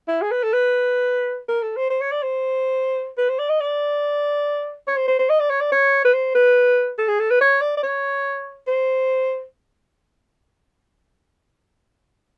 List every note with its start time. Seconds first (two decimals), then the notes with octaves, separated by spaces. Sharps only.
0.08 E4
0.22 G#4
0.32 B4
0.43 A4
0.53 B4
1.49 A#4
1.62 A4
1.76 C5
1.90 C5
2.01 C#5
2.12 D5
2.23 C5
3.18 B4
3.29 C5
3.39 D5
3.49 D#5
3.60 D5
4.88 C#5
4.97 C5
5.08 C5
5.19 C5
5.30 D#5
5.40 D5
5.50 C#5
5.61 D5
5.72 C#5
6.05 B4
6.14 C5
6.35 B4
6.98 A4
7.09 G#4
7.20 A4
7.31 B4
7.41 C#5
7.62 D5
7.77 D5
7.83 C#5
8.67 C5